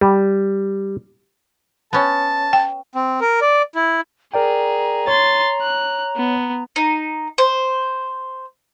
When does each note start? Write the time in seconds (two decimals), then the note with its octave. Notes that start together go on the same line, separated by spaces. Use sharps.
0.01 G3
1.93 B3 C#4 A5
2.53 G5
2.95 C4
3.21 A#4
3.41 D5
3.75 E4
4.34 G#4 A#4 D5 G5 A#5
5.07 C#5 C6 A6
5.62 F#6
6.17 B3
6.76 D#4
7.38 C5